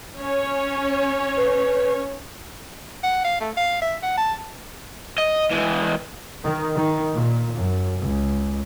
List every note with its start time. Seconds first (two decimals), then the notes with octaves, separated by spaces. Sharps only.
0.17 C#4 C#5
1.37 B4
3.03 F#5
3.25 F5
3.41 A3
3.57 F5
3.82 E5
4.03 F#5
4.17 A5
5.18 D#5
5.51 E3 G#3
6.44 D#3
6.77 D#3
7.14 A#2
7.57 F#2
8.00 C#2